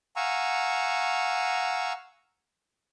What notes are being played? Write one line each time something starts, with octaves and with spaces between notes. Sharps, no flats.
F5 F#5 G#5 A#5 C#6 E6